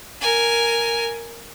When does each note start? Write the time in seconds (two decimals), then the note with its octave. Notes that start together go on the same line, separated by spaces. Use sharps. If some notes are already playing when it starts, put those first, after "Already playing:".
0.21 A#4 G#5